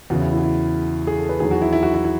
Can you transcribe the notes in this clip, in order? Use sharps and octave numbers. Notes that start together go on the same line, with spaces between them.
E2 C#3 E3 F#4
E4
E4
F#4
E4
G#4
A4
B4
E2 D#3 F#3 G#4
F#4
E4
E4
F#4
E4
E4